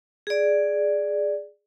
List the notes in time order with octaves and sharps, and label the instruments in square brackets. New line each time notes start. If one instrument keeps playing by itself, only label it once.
[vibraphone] G#4 D5